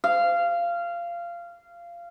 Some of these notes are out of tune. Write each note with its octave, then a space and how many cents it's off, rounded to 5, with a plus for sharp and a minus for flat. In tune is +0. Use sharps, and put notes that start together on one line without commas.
F5 -20